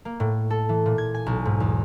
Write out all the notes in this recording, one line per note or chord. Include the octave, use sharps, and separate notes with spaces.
A#3
A2
A4
E3
A#2
G#6
G#5
B1
G#2
E2